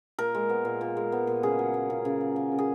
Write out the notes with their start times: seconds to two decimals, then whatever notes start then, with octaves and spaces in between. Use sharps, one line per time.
0.18 A#2 A#4
0.35 G#3
0.49 B3
0.65 A#2
0.81 A#2
0.97 G#3
1.12 B3
1.27 A#2
1.43 C#3 G#4
1.59 F#3
1.74 A#3
1.90 C#3
2.05 C#3
2.21 F#3
2.36 A#3
2.52 C#3
2.59 G#4